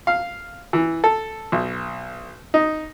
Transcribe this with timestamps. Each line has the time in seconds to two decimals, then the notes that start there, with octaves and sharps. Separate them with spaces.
0.07 F5
0.73 E3
1.04 A4
1.52 B1
2.54 D#4